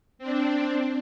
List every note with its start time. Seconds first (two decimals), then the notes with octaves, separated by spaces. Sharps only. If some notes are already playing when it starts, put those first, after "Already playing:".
0.19 C4 D4